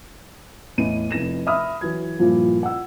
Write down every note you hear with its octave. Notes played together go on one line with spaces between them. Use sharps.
E2 A2 D#5 D#7
F1 E4 A#6 E7
E5 B5 D#6 F6
E3 F#3 G#6
G2 A#2 F3 E4
F#5 E6